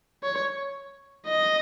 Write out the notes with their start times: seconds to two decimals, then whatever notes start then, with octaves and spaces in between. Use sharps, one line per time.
0.23 C#5
1.27 D#5